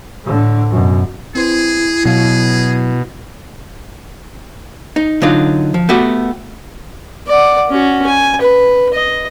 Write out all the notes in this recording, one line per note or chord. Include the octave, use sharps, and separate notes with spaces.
A2 D3
F#2 B2
C4 E4 G#4 B4 C5
B2 F#3 G#4 C#5 F5
D#4
D3 F#3 D#4 F4
F3
A3 B3 F#4 G4
D5 F#5
C#4 F#4
G#5
B4
D#5